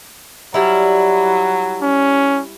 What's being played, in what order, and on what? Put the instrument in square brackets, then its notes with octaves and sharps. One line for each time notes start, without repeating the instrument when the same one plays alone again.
[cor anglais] F#3 [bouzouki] G3 E4
[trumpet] C#4